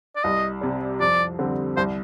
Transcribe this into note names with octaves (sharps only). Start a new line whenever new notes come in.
D5
C2 D#5
C3 G3
F2 D5
D3 G3 C4
C2 C5